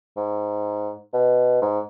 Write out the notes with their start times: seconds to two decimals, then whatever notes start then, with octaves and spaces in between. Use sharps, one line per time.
0.17 G#2
1.14 B2
1.62 G#2